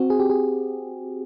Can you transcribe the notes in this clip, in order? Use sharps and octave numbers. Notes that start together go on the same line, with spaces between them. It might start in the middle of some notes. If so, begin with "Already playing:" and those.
Already playing: C4 F#4
G#4
G4
G#4